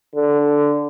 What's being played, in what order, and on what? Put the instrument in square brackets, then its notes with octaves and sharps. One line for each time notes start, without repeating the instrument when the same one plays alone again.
[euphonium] D3